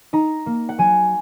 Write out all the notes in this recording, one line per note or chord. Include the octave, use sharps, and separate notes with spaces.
D#4 A#5
A#3
F#5
F#3 G#5